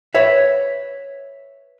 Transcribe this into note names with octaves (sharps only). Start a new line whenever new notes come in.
B4 C#5 E5